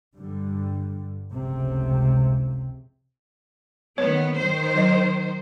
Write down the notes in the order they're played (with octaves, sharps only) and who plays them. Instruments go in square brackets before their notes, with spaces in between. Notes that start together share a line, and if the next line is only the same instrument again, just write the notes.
[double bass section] G2 D3 G3
F1 C#2 C3
[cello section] D#3 B3 [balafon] C#5
[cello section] D#3 C5
[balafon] F#3 D#5